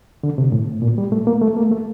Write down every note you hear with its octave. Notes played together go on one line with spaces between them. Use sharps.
D3
C3
A2
A#2
G3
A3
A#3
A3
A#3
A3